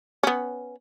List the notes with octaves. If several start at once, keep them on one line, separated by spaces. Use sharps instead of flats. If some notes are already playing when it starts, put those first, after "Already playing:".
B3 C#4